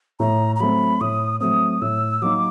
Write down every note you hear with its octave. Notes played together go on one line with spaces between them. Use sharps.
A2 A#5
A#5
F#3 A3 C4 B5
A2 D#6
F#3 A3 C4 D#6
A2 E6
F#3 A#3 D#4 D6